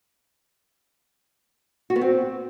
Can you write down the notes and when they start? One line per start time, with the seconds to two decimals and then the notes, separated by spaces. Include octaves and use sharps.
1.90 F#4
1.96 B3
2.01 C4